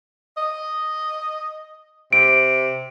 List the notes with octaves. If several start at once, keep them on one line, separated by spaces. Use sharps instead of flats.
D#5
C3 D7